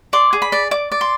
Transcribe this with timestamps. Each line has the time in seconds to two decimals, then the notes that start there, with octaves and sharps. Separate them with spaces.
0.13 D5 C6
0.33 G#4
0.42 B5
0.52 D5
0.71 D5 D6
0.92 D5
1.01 C6